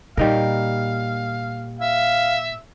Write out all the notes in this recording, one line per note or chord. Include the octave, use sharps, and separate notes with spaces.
A#2 G3 D#4 A#4 F5
E5 F5